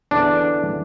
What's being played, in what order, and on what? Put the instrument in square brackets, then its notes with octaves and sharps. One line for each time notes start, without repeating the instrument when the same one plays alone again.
[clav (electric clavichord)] E2 D3 D4